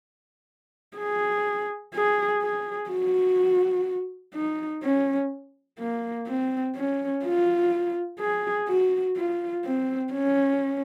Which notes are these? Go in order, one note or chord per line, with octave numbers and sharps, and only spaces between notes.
G#4
G#4
G#4
F#4
D#4
C#4
A#3
C4
C#4
F4
G#4
F#4
F4
C4
C#4